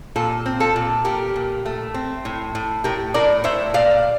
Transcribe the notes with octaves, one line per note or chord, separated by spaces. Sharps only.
A#2 F4 A4
C4
F4 A4
A#2
A#2 G4 A#4
A#2
A3
C4
A2
A2
A2 G4 A#4
A2 A#4 D5
A2 C5 E5
A#2 D5 F5